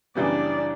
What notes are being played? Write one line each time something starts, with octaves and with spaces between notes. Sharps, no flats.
F#2 C#3 E3 G3 B3 D4 D5